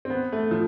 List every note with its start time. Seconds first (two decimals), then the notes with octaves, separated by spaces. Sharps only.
0.05 C4
0.10 B3
0.32 A3
0.51 F3